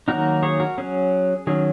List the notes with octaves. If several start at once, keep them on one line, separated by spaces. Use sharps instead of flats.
D#3 F#3 A#3 D#4 F#4 A#4
G#4 C#5
F#4 A#4
F#3 C#4 G#4
D#3 F#3 C#4 G#4